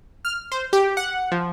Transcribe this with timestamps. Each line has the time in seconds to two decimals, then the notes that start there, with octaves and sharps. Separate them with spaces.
0.25 F6
0.52 C5
0.73 G4
0.97 F#5
1.32 F3